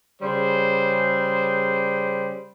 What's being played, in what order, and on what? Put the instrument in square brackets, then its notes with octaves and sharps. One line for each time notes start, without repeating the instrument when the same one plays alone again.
[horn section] C#3 G3 G#4 C5